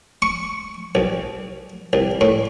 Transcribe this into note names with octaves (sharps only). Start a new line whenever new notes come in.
C#6
B1
C2
A2